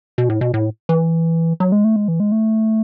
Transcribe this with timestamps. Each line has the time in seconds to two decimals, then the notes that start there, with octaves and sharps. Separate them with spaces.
0.18 B2
0.29 A2
0.41 B2
0.54 A2
0.89 E3
1.60 F#3
1.72 G#3
1.84 A3
1.96 G#3
2.08 E3
2.20 G#3
2.32 A3